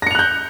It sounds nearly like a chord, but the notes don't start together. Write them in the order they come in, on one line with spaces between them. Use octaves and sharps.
A#6 C#7 F7 F#6 G6